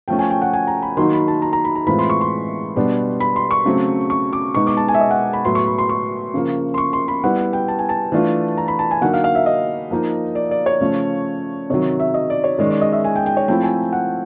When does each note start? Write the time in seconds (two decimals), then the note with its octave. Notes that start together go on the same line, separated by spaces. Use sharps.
0.08 F3 A3 C#4 G5
0.19 G#5
0.30 G5
0.42 F#5
0.53 G#5
0.67 A#5
0.82 B5
0.97 D#3 F#3 A#3 D#4 F#4 C6
1.13 B5
1.28 A5
1.42 A#5
1.53 A#5
1.65 B5
1.75 A#5
1.87 A2 E3 G#3 C4 F4 B5
1.99 C6
2.10 C#6
2.21 C6
2.76 B2 G3 B3 D4
3.20 B5
3.36 C6
3.51 C#6
3.65 C#3 F#3 A3 C4
4.10 C#6
4.33 D6
4.55 B2 G#3 B3 D#4 C#6
4.67 D6
4.77 A5
4.88 G#5
4.94 E5
5.00 D#5
5.11 F#5
5.33 B5
5.44 A2 F#3 B3 C6
5.55 C#6
5.67 B5
5.78 C6
5.89 C#6
6.34 C#3 F3 A#3
6.74 C6
6.78 C#6
6.93 C6
7.08 B5
7.23 G3 B3 E4 F#5
7.38 F#5
7.53 G5
7.68 A5
7.79 G#5
7.89 A5
8.12 E3 A3 D4 F4
8.58 A#5
8.68 B5
8.79 A5
8.91 G#5
9.01 D3 F#3 A#3 D#4 F#5
9.14 F5
9.24 F5
9.35 E5
9.46 D#5
9.91 F3 A#3 D#4
10.35 D5
10.51 D5
10.66 C#5
10.81 C#3 F3 A3 C#4
11.70 C3 D#3 F#3 C#5
11.99 E5
12.14 D#5
12.30 D5
12.44 C#5
12.59 D#3 G#3 C#4 D5
12.70 D5
12.81 D#5
12.92 E5
13.04 G#5
13.16 G5
13.26 G5
13.37 C#5
13.48 F3 A3 C4 E4 G5
13.63 G#5
13.93 F#5